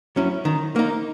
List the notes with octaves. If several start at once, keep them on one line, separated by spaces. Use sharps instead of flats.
F#3 C#4 E4
D#3
A#3 D#4